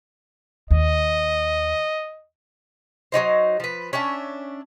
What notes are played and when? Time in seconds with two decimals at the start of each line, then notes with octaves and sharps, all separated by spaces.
0.71 D#2 D#5
3.12 F#3 C#4 D#4 C5
3.60 F3 B4
3.93 C#4 D4 E5 A5